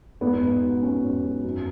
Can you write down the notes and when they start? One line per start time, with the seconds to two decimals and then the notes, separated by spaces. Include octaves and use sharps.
0.21 G#2 B3
0.42 G#2
0.63 F#3
0.82 F#3 C#4
1.04 G#2
1.24 F#3
1.44 F#2